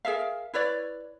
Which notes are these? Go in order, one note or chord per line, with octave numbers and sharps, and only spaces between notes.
G#4 A#4 E5 F5
E4 B4 C#5 D5